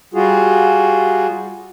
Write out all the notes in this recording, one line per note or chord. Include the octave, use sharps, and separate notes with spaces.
G3 F4 F#4 G#4